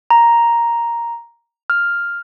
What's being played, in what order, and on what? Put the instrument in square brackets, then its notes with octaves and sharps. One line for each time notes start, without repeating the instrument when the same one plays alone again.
[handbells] A#5
F6